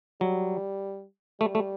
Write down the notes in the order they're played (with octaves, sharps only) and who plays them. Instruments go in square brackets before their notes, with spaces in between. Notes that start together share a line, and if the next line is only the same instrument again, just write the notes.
[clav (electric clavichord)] F#3 [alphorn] G3
[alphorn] G3 [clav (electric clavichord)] A3
[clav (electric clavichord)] A3